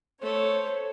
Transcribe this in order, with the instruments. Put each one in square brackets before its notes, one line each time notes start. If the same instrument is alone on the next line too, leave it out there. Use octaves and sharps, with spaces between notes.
[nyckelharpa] A3 A4 [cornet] C5 [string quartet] C#5